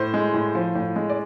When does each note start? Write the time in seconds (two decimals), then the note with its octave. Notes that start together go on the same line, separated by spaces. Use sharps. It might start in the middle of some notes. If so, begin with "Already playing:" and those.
Already playing: A2 C5
0.14 G#3
0.34 A2
0.55 F3
0.75 A2
0.96 G#3
1.10 D5